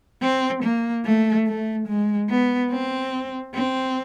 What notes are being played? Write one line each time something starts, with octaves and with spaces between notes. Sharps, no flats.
C4
A#3
A3
A3
G#3
B3
C4
C4